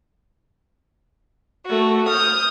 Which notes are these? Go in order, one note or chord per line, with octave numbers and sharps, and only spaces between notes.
A3 F#4
D#6 F6 G6